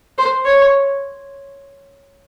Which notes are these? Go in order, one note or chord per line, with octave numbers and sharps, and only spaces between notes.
C5
C#5